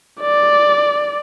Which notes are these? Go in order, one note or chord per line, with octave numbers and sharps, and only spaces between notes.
D5